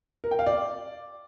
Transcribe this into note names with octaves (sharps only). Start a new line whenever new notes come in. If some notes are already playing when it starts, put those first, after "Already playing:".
A#4
G5
F5
D5